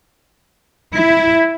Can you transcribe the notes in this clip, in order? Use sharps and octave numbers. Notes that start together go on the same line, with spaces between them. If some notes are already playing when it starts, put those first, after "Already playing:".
E4